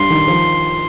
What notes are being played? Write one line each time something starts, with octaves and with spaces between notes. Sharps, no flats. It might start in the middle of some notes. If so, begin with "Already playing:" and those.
Already playing: G2 D4 C6
D#3
F3